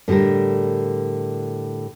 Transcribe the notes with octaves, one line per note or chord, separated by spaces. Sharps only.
A2 D3 G3 A4 A#4